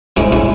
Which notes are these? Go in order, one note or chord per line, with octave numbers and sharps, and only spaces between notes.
G#2 C#4 E4
C#4 E4